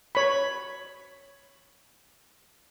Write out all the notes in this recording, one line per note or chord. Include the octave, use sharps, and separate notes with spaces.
C#5 B5